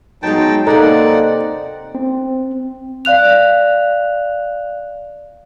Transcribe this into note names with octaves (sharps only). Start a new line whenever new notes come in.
F#3 G#3 B3 D#4 G5 A5
C3 A#3 D#4 A4 D5 F#5 A#5
C4
D5 F5 F#6 F7